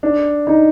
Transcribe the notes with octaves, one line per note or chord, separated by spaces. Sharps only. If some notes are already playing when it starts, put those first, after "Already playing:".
D4
D#4